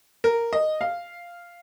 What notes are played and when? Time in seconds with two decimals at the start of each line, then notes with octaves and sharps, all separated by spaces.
0.24 A#4
0.53 D#5
0.81 F5